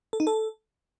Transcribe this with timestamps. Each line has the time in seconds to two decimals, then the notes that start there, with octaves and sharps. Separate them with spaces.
0.13 A4
0.20 D#4
0.27 A4